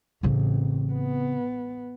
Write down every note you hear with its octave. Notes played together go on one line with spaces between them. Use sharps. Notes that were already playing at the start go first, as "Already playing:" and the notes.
A1 C#3 C4
B3